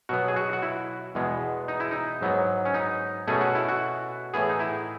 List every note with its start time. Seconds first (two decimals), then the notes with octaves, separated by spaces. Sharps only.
0.09 B2 F#3 B3 F#4
0.28 G#4
0.36 F#4
0.53 F#4
0.62 E4
1.15 E2 B2 G#3 B3
1.68 D#4
1.80 E4
1.91 D#4
2.21 G#2 F#3 B3
2.65 C#4
2.74 D#4
3.27 B2 A3 C#4 G#4
3.41 F#4
3.55 E4
3.68 F#4
4.34 A2 E3 B3 G#4
4.49 D#4
4.60 E4